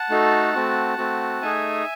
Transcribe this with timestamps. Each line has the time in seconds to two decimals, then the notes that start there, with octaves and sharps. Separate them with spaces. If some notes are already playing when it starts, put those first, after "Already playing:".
Already playing: F#5 A5
0.10 A3 D#4 F#4 A4
0.54 A3 C4 F#4
0.98 A3 C4 F#4
1.42 A3 D#4 G#4 E5 G#5